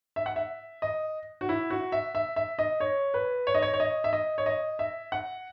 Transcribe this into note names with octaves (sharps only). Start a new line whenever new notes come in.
E5
F#5
E5
D#5
F#4
E4
F#4
E5
E5
E5
D#5
C#5
B4
C#5
D#5
C#5
C#5
D#5
E5
D#5
C#5
D#5
E5
F#5